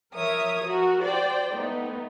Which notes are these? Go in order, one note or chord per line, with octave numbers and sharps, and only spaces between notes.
F3 A#4 C#5 E5 D#6
F#4 A#4
C5 D5 G5
A3 B3 D#4